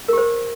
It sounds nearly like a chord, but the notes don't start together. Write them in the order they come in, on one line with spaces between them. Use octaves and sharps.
A#4 G4 C5